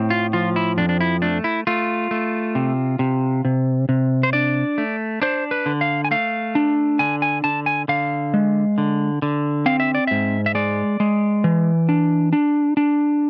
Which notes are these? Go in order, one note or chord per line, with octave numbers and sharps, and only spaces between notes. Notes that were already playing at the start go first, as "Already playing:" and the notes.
Already playing: A2 C4
F4
F3 F4
E4
F2 D4
D4
E4
A3 D4
E4
A3 F4
A3
C3
C3
C3
C3
C5
D4 D5
A3
D4 C5
B4
D3
F5
G#5
A3 F5
D4
D3 G#5
G#5
D3 A5
G#5
D3 F5
G#3
D3
D3
C4 F5
E5
D5
G#2 E5
E5
G#3 D5
G#3
E3
D4
D4
D4